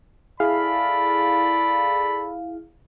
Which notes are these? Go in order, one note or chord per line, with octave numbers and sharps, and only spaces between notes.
E4 G#4 A4 D5 F5 B5